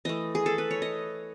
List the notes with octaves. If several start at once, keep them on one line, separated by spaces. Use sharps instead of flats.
E3 A3 D#5
G#4
A4
B4
C#5
D#5